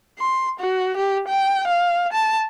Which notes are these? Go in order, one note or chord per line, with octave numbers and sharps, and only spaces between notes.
C6
F#4
G4
G5
F5
A5